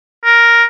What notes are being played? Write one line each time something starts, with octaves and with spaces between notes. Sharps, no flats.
A#4